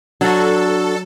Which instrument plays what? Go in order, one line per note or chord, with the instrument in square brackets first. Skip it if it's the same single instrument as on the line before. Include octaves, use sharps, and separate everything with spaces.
[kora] F#3 [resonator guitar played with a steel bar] D4 F#4 [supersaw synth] A4